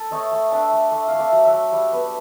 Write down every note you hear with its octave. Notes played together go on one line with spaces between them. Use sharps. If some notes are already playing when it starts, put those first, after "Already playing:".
Already playing: A4
A3 C#5 D#5
A3
D4 D5 E5
A3
A3
A3 F5
D5 E5
F#3
E5 F#5
A3
G3
B3